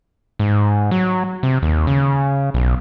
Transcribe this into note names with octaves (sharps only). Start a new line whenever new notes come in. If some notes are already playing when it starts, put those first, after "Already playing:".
G#2
F#3
C3
D#2
C#3
B1